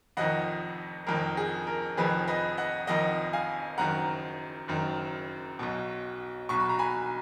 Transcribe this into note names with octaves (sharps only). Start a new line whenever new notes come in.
F1 F2 D#3 D#5 F#5
F1 F2 D#3 A#4
G#4
A#4
F1 F2 D#3 G#4 B4
B4 D#5
D#5 F#5
F1 F2 D#3 D#5 F#5
F5 G#5
F#1 F#2 D#3 F#5 A#5
F#1 F#2 D#3
B1 B2
B1 B2 C#6
B5
A#5
G#5 B5